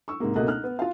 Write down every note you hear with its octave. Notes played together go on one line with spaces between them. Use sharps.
C#6 E6
G#2 C3 G#3 A#3
C#2 B2 A3 A#3 D#5 F#6
D#4 F6 F#6
B3
F4 F5